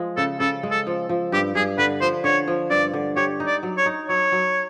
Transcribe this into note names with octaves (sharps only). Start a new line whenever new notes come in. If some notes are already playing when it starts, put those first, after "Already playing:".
Already playing: F3 G#3
C#3 A4
C#3 A4
G#3
A4
F3
F3
G2 G4
G2 G#4
D3 B4
F3 C5
D3 C#5
F3
G2 D5
D3
G4 C#5
D#4
D5
F#3
C#5
D#4
F#3 C#5
F#3